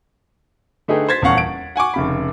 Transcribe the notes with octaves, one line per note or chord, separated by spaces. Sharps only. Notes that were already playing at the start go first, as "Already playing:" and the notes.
D3 A3 D#4 G#4 B4 G5
C5 C6 G#6 A6 B6
D#1 E2 C#4 F5 F#5 C#6
D7
F#5 G#5 C#6 D6
F1 C#3 B5